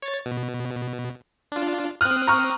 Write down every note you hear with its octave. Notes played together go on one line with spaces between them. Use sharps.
C#5 A6
B2
D4 F4
C4 D#6 F6 F#6
A#5 C#6 F6